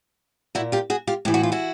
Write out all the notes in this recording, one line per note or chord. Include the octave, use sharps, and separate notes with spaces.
A#2 E4 F#4
F4 G4
F#4 G#4
F4 G4
A2 E3 G4
F#4
F4
E4 F#4